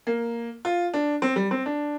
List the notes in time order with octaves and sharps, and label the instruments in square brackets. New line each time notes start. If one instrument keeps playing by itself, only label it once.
[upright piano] A#3
F4
D4
C4
G3
C4
D4